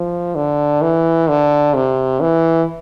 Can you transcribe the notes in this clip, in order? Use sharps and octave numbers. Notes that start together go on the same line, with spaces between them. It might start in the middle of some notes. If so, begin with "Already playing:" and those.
Already playing: F3
D3
E3
D3
C3
E3